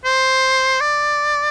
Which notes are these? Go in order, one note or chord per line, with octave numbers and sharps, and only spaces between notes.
C5
D5